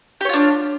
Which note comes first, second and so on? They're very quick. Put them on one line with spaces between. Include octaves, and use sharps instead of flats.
G4 C#5 F4 D4